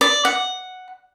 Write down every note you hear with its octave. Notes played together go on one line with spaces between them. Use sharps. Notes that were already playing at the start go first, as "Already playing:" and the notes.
D5
F#5